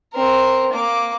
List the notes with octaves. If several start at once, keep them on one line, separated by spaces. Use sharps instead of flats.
C4 A#4
A#3 D6